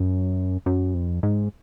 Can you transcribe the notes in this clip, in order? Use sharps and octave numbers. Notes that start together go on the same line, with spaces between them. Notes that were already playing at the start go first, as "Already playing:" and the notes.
Already playing: F#2
F#2
F2
G#2